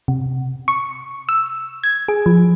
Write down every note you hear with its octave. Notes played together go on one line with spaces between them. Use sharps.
C3
C#6
E6
G#6
G#4
F3